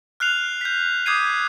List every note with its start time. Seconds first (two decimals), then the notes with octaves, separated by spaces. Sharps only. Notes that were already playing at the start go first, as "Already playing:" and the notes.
0.20 F6 F#6 C7 F7
0.61 G6 B6
1.06 D6 D#6 G6 G#6 C7 D#7